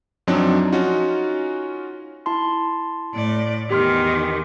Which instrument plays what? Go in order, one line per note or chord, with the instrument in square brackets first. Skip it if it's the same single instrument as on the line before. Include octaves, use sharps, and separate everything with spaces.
[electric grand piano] F#2 F3 F#3 C4 D4 D#4
C#4 D#4 F4 F#4
[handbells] E4 A5 C6
[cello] A2 D5
[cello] E2 D#3 [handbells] G4 C6 F6